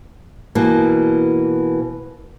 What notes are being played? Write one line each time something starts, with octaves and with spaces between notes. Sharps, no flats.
B2 E3 A#3